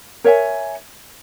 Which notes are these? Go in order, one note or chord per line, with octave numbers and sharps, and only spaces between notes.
A#4 C#5 E5 G#5